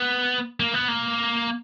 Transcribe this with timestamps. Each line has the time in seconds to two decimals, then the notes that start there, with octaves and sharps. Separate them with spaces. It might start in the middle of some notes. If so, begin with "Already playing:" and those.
Already playing: B3
0.60 A#3
0.74 B3
0.88 A#3